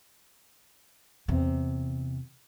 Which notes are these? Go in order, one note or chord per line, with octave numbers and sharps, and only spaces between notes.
E2 C3